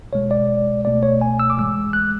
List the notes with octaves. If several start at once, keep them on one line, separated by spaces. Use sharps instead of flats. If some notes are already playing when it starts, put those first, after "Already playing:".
B1 B2 G#3 C#5
D5
C#2 B2 A3 D5
C#5
G#5
E6
D6
G#2 E3 G#3 E6
F#6